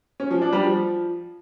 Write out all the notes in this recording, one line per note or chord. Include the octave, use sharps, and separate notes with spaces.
C#4
F3
D4
G3
F3